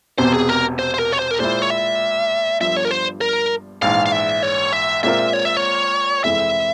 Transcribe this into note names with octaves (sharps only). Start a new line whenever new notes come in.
E1 E2 C3 C5
G#4
A#4
C5
C5
A#4
C#5
C5
A#4
A#2 G#3 E4 C5
C#5
E5
G1 G2 F3 E5
C#5
A#4
C5
A#4
A#1 G#2 E3 F5
F5
E5
C#5
E5
A#2 G#3 C4 F4 A#4 E5
C#5
E5
C#5
F1 F2 E3 G#3 E4 E5